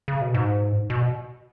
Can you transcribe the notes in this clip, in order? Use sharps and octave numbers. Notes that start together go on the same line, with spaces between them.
C#3
B2
G#2
B2